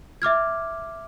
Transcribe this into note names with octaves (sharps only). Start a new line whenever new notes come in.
E5 D6 F6 G#6